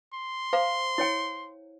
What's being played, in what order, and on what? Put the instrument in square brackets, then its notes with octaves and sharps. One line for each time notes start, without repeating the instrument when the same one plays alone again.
[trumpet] C6
[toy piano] C5 F5 A#5
E4 C#5 G5